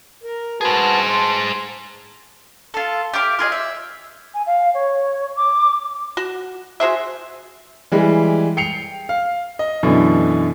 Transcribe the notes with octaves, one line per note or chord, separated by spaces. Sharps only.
A#4
F#4 G#4 B4 C5 A5
A5 C6
F4 A4
G4 E5 F5 D6
F4 G#4 A4 D#5
E5
G#5
F5
C#5
D6
F#4
F#4 G#4 C5 E5
E3 G3 G#3
G5 C7 C#7 F7
F5
D#5
F#2 B2 D3 E3